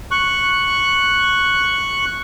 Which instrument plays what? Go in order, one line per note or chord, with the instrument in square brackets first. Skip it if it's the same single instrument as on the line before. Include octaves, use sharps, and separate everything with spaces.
[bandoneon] C#6 F#6